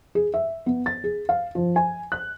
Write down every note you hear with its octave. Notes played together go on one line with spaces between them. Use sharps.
G#4
E5
B3
A6
G#4
F5
F3
G#5
F#6